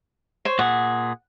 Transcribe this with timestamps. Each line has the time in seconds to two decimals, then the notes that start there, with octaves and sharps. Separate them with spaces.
0.45 C5 C#5
0.59 A#2 G#4 F#5